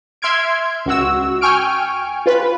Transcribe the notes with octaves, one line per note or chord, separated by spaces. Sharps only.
E5 C6 F6 G#6 D7
C#2 F#4 E6
G5 G#5 C#6 F6 D7
F4 B4